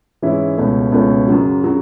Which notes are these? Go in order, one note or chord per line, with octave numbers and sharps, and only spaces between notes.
G#2 E3 G#3 C#4 E4
C#2 B2 A3 C#4
C#2 B2 A3 C#4
F#2 C#3 F#3
C#3 F#3